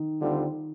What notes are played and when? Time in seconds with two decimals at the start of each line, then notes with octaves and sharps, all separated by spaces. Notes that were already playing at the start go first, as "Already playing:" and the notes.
Already playing: D#3
0.20 D2 D3 G3 C4 F4